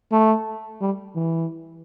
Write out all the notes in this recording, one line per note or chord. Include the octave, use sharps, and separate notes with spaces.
A3
G3
E3